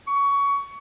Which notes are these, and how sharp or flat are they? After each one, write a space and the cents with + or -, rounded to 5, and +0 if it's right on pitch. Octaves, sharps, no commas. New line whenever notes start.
C#6 +20